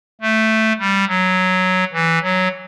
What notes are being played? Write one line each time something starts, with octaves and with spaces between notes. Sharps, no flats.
A3
G3
F#3
E3
F#3